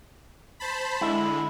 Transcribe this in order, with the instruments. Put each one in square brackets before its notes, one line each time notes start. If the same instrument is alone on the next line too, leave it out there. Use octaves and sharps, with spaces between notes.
[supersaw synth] C5 A5 B5
[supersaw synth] D3 G#3 [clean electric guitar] E4